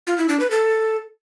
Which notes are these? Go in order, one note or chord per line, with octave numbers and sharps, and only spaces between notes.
F4
E4
D4
B4
A4